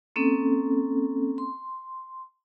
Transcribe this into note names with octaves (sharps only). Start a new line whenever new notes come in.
A#3 C4 C#4 A4
C6